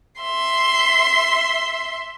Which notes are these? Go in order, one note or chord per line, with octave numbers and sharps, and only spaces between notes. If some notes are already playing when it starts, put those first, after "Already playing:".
E5 C6